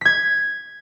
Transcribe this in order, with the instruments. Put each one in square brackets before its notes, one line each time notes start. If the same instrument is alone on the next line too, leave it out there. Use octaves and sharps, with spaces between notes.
[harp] G#6 B6